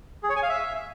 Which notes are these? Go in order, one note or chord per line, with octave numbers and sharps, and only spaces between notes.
G#4
C#5
G#5
F5
E5